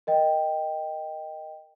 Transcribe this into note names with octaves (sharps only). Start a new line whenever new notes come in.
A#4 D#5 G5